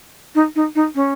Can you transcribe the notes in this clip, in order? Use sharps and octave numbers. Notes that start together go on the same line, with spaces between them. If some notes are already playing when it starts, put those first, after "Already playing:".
D#4
D#4
D#4
C#4